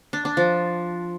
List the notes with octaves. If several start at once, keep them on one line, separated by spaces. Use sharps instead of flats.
D4
D4
F3